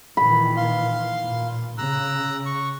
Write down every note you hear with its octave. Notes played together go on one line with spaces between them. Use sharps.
A#2 D#3 E3 B5
F5 C6
A#2
C#3 A#5 E6 F#6
C#6